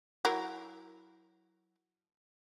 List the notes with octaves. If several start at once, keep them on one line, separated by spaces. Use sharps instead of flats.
F#3 E4 A#4